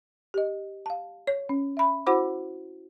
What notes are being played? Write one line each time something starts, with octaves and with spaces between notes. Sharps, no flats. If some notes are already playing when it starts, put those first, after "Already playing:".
G4 D#5
F5 A5
C#5
C#4
E5 B5
E4 F#4 C5 F#5 B5 D6